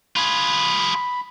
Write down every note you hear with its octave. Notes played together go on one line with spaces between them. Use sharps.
F4 G#4 B5